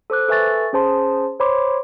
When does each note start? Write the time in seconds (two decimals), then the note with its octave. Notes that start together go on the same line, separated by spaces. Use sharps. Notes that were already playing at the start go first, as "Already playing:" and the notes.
0.10 A4 C5 D6 F#6
0.28 A4 B4 E5 G#5 C#6 A6
0.73 C#4 G#4 C5 A5 C6 D#6
1.40 C5 C#5 B5 C6 D6